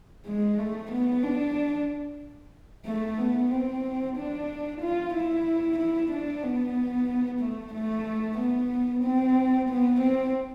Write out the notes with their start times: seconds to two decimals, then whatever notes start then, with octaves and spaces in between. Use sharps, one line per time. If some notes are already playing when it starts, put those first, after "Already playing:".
0.26 G#3
0.58 A3
0.91 B3
1.23 D4
2.86 A3
3.18 B3
3.51 C4
4.16 D4
4.81 F4
5.14 E4
5.78 E4
6.11 D4
6.43 B3
7.40 A3
7.74 A3
8.38 B3
9.04 C4
9.69 B3
10.01 C4